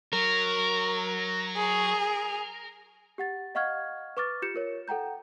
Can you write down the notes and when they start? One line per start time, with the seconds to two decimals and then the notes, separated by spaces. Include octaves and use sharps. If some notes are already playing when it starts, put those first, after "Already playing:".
0.13 F#3 A#4
1.56 G#4
3.18 G4 F#5 A6
3.55 D#5 F5 F#5 C#6 F6 G#6
4.17 B4 C#6 D6 F6 A6
4.42 F4 G4 G6 C#7 E7
4.54 F4 A#4 C#5
4.88 A4 F#5 G5 A#5 G6